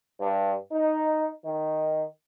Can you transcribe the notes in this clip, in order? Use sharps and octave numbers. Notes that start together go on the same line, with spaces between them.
G2
D#4
D#3